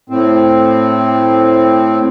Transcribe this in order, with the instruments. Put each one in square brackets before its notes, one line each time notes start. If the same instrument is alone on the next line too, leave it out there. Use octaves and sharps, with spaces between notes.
[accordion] A2 C4